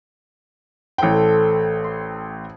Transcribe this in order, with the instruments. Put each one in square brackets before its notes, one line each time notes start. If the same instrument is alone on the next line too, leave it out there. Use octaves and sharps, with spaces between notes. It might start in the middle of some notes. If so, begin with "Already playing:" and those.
[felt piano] A1 G5 [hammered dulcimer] A4 C5
[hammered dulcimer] C6